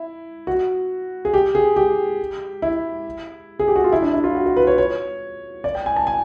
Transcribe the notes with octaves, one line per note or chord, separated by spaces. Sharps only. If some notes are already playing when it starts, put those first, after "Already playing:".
Already playing: E4
F#4
G#4
G4
G#4
G4
E4
G#4
G4
F#4
F4
E4
D4
E4
F4
F#4
F#4
B4
C#5
C#5
D5
G5
G#5
A5
G#5